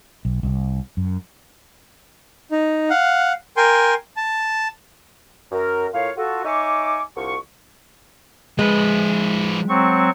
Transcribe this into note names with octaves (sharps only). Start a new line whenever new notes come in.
B1
C2
F#2
D#4
F5 F#5
A#4 G5 G#5 C6
A5
F#2 A#4
A2 F4 A#4 C#5 F5
F4 F#4 A4
D#4 C#5 E5 G#5 C#6 D6
C2 D3 F4 C#6
F3 G#3 B4
F#3 C4 C#6